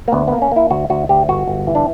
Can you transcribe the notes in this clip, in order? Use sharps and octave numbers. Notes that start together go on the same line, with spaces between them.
A#3
D2 B3
A#3 B3
C#4
A#3 E4
D2 F#4
D2 F#4
D2 G4
G1 F#4
G1
E3
D4